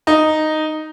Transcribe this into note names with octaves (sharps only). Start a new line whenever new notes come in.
D#4